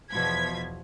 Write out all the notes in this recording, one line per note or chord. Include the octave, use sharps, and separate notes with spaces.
E2 B2 F3 G#6 B6